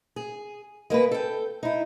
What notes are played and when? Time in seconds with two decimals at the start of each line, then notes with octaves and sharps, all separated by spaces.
0.16 G#4
0.90 G#3 A#3 B3 B4
1.11 A4 G5
1.63 D#4 E4